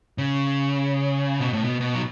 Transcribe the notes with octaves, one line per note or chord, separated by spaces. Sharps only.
C#3
B2
A2
B2
B2
F#3